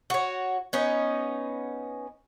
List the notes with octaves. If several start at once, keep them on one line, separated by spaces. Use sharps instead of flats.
F#4 C#5
B3 C#4 D#4